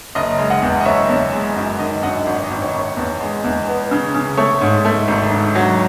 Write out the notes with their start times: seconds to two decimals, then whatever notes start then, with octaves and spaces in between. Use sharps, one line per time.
0.15 F#1 D#5
0.39 G#3
0.50 D#5 F#5
0.62 E2
0.80 D#5
0.86 F#1 C#5 E5
1.09 E2
1.33 G#3
1.56 F#2 D#5
1.79 D#3 D#5
2.03 F#2 D#5 F#5
2.26 G#1
2.44 D#5
2.50 G#1
2.62 C#5
2.73 G#1
2.79 C#5
2.97 E2
3.20 G#3
3.44 E2
3.67 B3
3.91 C#3
4.14 C#3
4.37 A3 C#5
4.61 G#2
4.85 A3
5.08 G#1
5.32 G#2
5.55 F#3